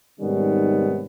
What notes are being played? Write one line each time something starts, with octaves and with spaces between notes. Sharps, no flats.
G#2 C3 D#3 G3 B3 C#4